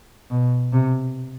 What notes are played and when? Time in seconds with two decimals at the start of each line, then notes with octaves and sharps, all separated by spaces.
0.30 B2
0.72 C3